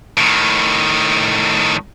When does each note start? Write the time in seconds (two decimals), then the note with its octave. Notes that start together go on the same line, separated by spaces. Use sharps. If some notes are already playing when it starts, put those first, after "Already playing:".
0.17 A2 D#3